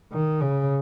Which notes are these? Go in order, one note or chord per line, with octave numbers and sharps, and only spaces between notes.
D#3
C#3